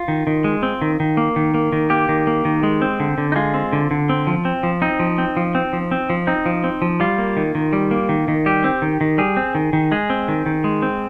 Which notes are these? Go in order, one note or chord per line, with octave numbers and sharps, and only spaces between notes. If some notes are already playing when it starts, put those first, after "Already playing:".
Already playing: F4
D#3
D#3
G#3
C4
D#3
D#3
A#3
D#3
A#3
D#3
A#3 G4
D#3
A#3
D#3
G#3
C4
D3
D3
D#4
G#3 F4
C4
D3
D3
C4
F3
C4
F3
C4 D#4
F3
C4
F3
C4
F3
C4
F3
C4 D#4
F3
C4
F3
G3 F4
A#3
D#3
D#3
G3
A#3
D#3
D#3
G3 G4
C4
D#3
D#3
G3 G#4
C4
D#3
D#3
G#3 G#4
C4
D#3
D#3
G#3
C4